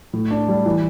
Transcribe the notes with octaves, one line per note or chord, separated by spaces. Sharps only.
A2
D4
G3
E3